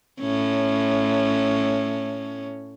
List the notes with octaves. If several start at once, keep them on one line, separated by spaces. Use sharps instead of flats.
A2 C#4